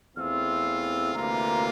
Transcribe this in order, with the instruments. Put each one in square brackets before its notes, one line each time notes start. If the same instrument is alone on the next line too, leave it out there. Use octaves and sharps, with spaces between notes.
[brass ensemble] E2 E3 A3 C4 F4 [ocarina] E6 F6
[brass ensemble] D2 C3 E3 A#3 F4 [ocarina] A#5